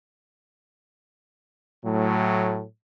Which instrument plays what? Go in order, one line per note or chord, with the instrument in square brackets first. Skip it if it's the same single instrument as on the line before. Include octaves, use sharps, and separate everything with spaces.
[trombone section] A2 F#3